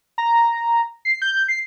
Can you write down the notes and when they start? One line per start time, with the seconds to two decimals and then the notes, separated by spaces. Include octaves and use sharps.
0.18 A#5
1.05 C7
1.22 G6
1.48 C7